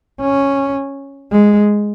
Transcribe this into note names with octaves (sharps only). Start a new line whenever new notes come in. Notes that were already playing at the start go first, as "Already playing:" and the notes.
C#4
G#3